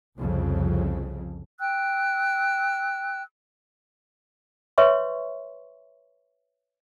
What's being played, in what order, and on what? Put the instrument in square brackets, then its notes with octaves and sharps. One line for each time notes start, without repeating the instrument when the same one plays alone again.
[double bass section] C2 F2 C#3
[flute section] G5 E6 F#6
[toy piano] B4 C#5 E5 C6 C#6